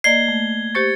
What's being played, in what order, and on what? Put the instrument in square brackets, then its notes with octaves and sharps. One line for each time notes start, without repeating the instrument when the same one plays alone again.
[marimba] A#3 D5 D#5 [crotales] G#6 G7 [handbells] C7
[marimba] A3
[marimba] G4 C5 C#6 [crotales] A6 C#7